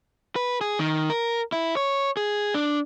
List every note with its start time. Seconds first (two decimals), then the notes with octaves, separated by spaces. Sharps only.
0.36 B4
0.61 G#4
0.79 D#3
1.10 A#4
1.52 E4
1.77 C#5
2.17 G#4
2.54 D4